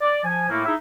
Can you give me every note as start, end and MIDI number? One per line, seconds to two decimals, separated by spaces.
0.01 0.23 74
0.24 0.48 53
0.24 0.48 80
0.50 0.64 45
0.50 0.64 57
0.50 0.64 58
0.65 0.75 63
0.65 0.75 64
0.65 0.75 68
0.65 0.75 76